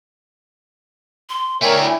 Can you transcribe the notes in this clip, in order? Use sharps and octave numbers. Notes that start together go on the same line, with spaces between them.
C6
A3 D4 A#4 C#5 G5 G#5
E4